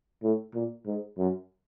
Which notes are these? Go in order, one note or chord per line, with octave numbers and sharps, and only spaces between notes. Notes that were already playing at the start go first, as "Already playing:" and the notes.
A2
A#2
G#2
F#2